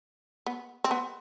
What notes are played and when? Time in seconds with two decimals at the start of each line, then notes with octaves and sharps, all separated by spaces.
0.46 B3
0.84 C4
0.91 B3